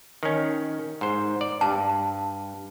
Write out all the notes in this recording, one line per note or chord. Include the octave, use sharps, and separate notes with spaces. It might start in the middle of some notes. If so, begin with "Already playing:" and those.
D#3 C#4
G#2 C5
D5
G2 A5